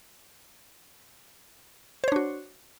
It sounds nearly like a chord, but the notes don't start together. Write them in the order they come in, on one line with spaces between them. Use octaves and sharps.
C5 C#5 D4 F#4